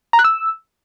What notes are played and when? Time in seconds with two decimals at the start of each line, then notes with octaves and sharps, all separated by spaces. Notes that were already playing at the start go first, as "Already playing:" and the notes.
0.13 A#5
0.19 F#6
0.24 E6